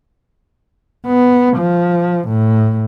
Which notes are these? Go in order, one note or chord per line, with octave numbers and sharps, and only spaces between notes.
B3
F3
A2